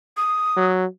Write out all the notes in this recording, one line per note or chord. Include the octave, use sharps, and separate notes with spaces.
D#6
F#3